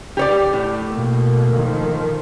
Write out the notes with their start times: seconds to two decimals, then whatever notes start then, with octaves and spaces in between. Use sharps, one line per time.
0.17 G4 C#5 D5
0.53 A2
0.92 B2 A#3
1.55 D#3 F3